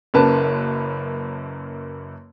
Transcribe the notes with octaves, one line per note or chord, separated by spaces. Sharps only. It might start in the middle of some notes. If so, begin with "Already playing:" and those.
F#1 F#2 A#3 B4 A5